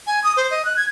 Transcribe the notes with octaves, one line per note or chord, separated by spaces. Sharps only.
G#5
D#6
C5
D#5
F#6
G#6